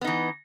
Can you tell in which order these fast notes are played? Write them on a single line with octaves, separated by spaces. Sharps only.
B3 D#4 E3